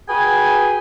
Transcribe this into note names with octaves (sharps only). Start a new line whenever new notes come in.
F#4 G#4 B4 G5 G#5